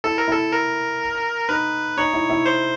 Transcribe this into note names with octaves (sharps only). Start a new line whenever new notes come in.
E4 A4
A#4
E4 A4
A#4
D#4 B4
D#4 C#5
E4
E4
C5